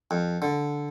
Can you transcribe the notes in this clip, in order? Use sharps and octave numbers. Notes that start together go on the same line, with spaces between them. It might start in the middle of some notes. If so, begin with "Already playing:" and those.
F2
D3